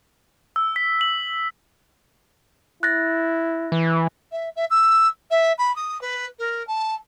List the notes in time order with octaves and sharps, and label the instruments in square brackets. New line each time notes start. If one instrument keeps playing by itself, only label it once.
[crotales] E6
B6
F#7
[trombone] E4 [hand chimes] F#6 A6 A#6
[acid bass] E3
[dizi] E5
E5
E6
E5
B5
D#6
B4
A#4
A5